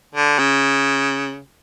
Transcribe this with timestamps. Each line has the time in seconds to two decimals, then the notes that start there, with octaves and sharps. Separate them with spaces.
0.15 D3
0.39 C#3